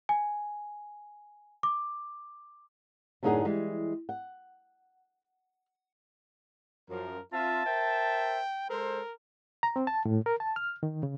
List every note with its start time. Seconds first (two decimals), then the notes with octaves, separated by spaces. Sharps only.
0.09 G#5
1.63 D6
3.23 F#2 A2 D3 D#4 G#4 F#5
3.45 E3 G3 G#3
4.09 F#5
6.90 F#2 F3 A#4
7.33 C4 F4 E5 A5
7.66 A#4 C5 E5 G5
8.70 G#3 A4 A#4 C5
9.63 A#5
9.76 C4
9.87 A5
10.05 A2
10.26 A#4
10.40 A5
10.56 F6
10.83 D#3
11.03 C#3